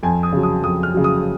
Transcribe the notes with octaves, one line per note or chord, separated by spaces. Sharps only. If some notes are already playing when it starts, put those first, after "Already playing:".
F2 G#5
D#6
C#3 F#3
D#6
F2 D#6
F6
C#3 F#3
D#6